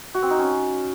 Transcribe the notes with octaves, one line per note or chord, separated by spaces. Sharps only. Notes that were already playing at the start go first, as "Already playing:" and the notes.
F#4
C4
D#4
C#4